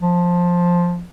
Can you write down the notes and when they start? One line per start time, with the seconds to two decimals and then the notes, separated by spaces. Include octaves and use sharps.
0.01 F3